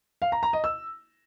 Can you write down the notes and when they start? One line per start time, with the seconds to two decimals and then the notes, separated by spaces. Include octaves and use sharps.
0.22 F5
0.32 A#5
0.43 A#5
0.53 D#5
0.64 E6